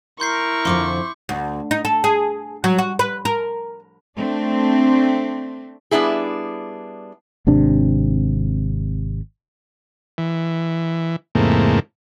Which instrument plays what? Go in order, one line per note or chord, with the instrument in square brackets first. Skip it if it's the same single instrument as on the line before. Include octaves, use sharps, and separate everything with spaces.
[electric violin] E4 C#6 [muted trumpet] A#4 [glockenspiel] C6 G6 C7
[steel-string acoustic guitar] F2 D3 F3 [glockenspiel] C6 D6
[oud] D2
D#4
A4
G#4
F#3
F#4
B4
A#4
[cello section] A3 C4 D4
[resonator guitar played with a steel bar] G3 B3 D4 E4 G#4
[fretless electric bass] G#1 C3 D4
[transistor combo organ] E3
E2 G#2 C3 A3 A#3